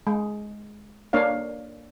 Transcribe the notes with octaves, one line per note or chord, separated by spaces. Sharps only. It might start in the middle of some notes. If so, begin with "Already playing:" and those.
G#3
A#3 D4 C#5 F5